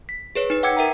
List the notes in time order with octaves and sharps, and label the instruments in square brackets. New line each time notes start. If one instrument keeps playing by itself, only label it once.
[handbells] B6
G#4 B4 C#5
D#4 B4
F#5 G5 D6 E6 G#6 C#7
A#4 E5 G5 A#5